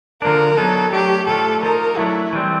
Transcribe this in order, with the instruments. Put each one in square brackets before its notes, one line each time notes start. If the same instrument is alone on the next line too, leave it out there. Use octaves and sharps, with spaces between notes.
[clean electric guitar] D3 F3 A#3 D4 [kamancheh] A#4
[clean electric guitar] F#3 B3 D#4 [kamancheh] A4
[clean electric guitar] F#3 A3 D4 [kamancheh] G4
[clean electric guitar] A2 F3 A3 D4 [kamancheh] A4
[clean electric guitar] F3 A#3 D#4 [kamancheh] A#4
[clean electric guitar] F#3 A3 D4 [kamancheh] E4
[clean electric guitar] E3 G3 C4